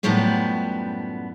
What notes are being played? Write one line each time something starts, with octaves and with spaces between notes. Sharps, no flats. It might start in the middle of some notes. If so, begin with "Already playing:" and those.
F#2 A2 F3 G3 B3 F#4